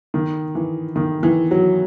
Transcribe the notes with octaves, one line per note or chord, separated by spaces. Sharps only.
D#3
E3
D#3
E3
F#3